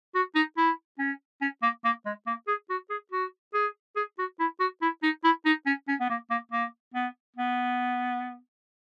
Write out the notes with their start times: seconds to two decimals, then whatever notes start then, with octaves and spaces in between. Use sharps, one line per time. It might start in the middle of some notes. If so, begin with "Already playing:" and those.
0.15 F#4
0.35 D#4
0.57 E4
0.99 C#4
1.41 C#4
1.62 A#3
1.84 A#3
2.06 G#3
2.27 A#3
2.48 G#4
2.70 F#4
2.90 G#4
3.12 F#4
3.54 G#4
3.96 G#4
4.18 F#4
4.40 E4
4.60 F#4
4.82 E4
5.03 D#4
5.24 E4
5.46 D#4
5.66 C#4
5.88 C#4
6.00 B3
6.10 A#3
6.30 A#3
6.51 A#3
6.94 B3
7.36 B3